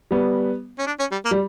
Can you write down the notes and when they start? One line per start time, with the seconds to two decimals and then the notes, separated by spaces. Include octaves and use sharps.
0.11 G3 B3
0.79 C#4
0.87 D4
0.99 C#4
1.12 G3
1.25 A#3
1.31 G3